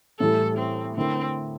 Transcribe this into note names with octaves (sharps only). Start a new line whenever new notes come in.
A2 E3 G3 A4
C4
D3 A3 C4 E4 A#4